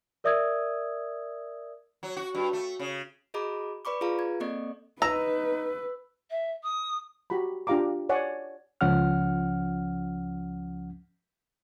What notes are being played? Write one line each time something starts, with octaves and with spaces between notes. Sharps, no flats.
A#4 D5 E5 D#6 E6 G#6
F#3
F#4
G2
A3
C#3
F#4 G#4 D#5 A#5 B5 D6
B4 D5 B5 C#6 D6
F4 G#4 B4 F5 A#5
G#6
A#3 C4 A4 D5 D#5 C#6
D#4 B4 A#5 E6
E5
D#6
F#4 G4 A#5 B5
D4 F4 G4 F5 A#5 D6
C#5 D5 F#5 G#5
C#2 F3 C#4 F#5 F6